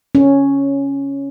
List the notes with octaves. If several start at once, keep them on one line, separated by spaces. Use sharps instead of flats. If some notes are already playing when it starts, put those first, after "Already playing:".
C#4